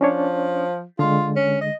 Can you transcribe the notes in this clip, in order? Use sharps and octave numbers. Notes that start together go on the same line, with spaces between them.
F3 C#4 D4 C#5
D3 G#3 F4
C#4
D#5